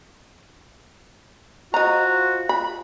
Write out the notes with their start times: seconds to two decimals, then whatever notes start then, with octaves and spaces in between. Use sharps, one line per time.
1.74 F4 F#4 C5 D#5 A#5
2.49 B5